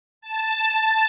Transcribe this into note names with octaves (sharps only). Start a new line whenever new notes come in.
A5